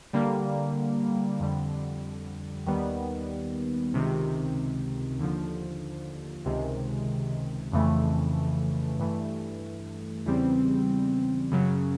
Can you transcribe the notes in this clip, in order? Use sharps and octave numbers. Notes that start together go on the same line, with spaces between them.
D3 G3 A#3
F2 D3 G3
D#2 D#3 G3 B3
C#2 C3 D#3
D#2 D3 F3
C#2 C3 D#3 G#3
F2 C#3 E3 A3
G2 E3 A3
E2 C#3 E3 G3 C4
F#2 C#3 F#3